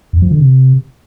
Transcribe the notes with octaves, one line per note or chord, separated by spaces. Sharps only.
F2
F3
D3
C3